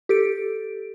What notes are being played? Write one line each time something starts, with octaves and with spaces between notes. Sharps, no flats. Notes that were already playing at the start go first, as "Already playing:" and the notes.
G4 A4 D7